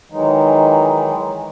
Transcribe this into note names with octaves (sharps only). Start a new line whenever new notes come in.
D#3 E3 F#3 G#3 D#4